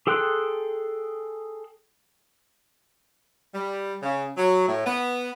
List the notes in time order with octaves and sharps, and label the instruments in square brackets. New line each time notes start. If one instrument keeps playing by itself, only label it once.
[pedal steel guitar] G#4 A4 G5 C6 F#6
[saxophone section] G3
C#3
F#3
A2
B3